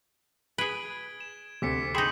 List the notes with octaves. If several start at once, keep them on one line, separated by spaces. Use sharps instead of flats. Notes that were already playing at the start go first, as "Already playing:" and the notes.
G#4 B4 G#6 D7 G7
E7
D2 C3 D6 B6 C#7
D#4 G#4 G5 B5 C6 E7 F#7